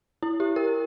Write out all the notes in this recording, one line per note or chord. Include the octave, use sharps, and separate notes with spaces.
E4
G4
A#4